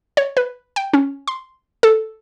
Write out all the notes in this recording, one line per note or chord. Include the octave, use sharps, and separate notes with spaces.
C#5
B4
G5
C#4
C6
A4